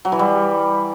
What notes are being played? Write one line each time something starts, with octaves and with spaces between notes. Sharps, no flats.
F#3
E3
G3